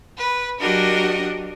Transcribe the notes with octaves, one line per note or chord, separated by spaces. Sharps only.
B4
F#3 D4 F#4 G4 A#4 D#5